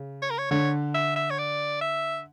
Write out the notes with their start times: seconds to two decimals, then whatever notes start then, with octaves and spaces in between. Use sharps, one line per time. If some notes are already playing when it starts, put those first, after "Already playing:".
Already playing: C#3
0.22 C#5
0.30 A#4
0.39 C#5
0.51 D3 C#5
0.95 E5
1.16 E5
1.31 C#5
1.39 D5
1.81 E5